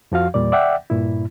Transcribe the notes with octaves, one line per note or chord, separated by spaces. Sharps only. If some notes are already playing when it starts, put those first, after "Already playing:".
F2 F3 F#4 F5
E2 A#2 G3 D5
D5 E5 F#5 G5
G2 A#2 E4